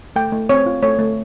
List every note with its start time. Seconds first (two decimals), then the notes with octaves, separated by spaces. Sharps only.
0.16 A3 G5
0.32 A3
0.49 C4 C#5
0.66 F4
0.83 A3 C#5
0.99 A3